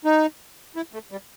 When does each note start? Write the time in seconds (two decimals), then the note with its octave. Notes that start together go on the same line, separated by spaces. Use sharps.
0.05 D#4
0.76 E4
0.93 A3
1.11 G3